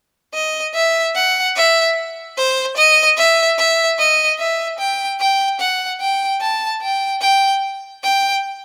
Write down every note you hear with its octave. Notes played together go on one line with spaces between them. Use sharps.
D#5
E5
F#5
E5
C5
D#5
E5
E5
D#5
E5
G5
G5
F#5
G5
A5
G5
G5
G5